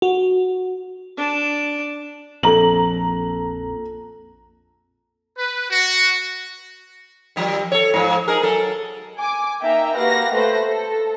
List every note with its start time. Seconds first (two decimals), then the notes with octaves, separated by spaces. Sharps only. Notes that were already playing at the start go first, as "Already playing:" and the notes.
0.02 F#4
1.17 D4 A5
2.43 A#1 F2 A4 A#5 F#7
5.37 B4
5.70 F#4
7.36 D#3 F3 G3
7.72 A4 C#5
7.94 G#2 F3
8.28 D#4 G#4 A#4
8.43 F#3 A4 A#4
9.18 G#5 D6
9.62 A#3 D#4 E5 G5 A#5
9.96 A#3 F#4 G4 B4 F5 A#6
10.33 A3 B4 C5 A#6
10.68 A4